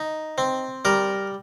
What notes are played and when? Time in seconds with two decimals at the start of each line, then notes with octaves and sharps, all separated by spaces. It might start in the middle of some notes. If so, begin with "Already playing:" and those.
Already playing: D#4
0.38 C4
0.85 G3 A#4